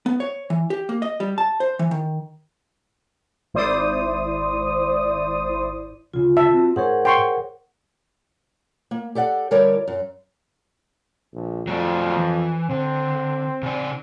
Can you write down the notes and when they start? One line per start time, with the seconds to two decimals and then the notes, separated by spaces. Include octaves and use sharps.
0.06 B3
0.20 C#5
0.50 E3
0.70 G4
0.89 A#3
1.02 D#5
1.20 G3
1.38 A5
1.60 C5
1.79 E3
1.91 D#3
3.54 G#1 E4 C5 D5 D#6
6.13 D2 C#3 F4
6.37 E5 A5
6.54 C4 F#4
6.76 G#2 G#4 A#4 C5 C#5 F#5
7.05 G5 C6 C#6
8.91 A#3
9.15 G4 A4 D5 F#5
9.51 D3 G3 E4 A#4 C#5 D5
9.88 F#2
11.33 A#1
11.67 F2 F#3 A3 D5
12.17 E3
12.70 D3 C4
13.63 C#3 D5